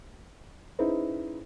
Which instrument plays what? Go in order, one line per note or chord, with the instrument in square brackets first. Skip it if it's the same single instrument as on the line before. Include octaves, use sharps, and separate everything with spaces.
[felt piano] C#4 D#4 E4 G#4 B4 C5